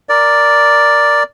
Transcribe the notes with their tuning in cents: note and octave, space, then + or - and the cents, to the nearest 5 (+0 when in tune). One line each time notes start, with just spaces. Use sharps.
A#4 +0 D5 +0